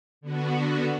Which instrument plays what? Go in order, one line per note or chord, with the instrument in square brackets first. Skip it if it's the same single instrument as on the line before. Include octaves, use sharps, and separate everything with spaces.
[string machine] D3 B3 F#4